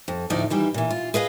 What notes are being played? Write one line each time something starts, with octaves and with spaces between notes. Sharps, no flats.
F2
D2 A2 F3 D#4 D5
D#3 E3 G3
A#2 E3
F4
G#4 B4 D#5 F5